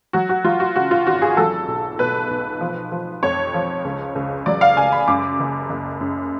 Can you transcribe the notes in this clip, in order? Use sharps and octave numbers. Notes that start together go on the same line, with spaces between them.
F#3 F#4
F#4
F#3 F4
F#4
C#3 F#4
F4
G#1 F#4
G#4
F#3 A4
B1
B2 B4
B1
F3
F3
F2 C#5
F3
C#2
C#2
F#3 D5
F5
C#2 G#5
B5
F#2 D6
F#1
F#1
F#2